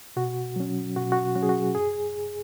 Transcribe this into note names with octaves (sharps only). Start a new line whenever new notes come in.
B2 F#4
F#3 C#4
B2 F#4
F#4
F#3 C#4 F#4
G#4
F#4
F#2 G#4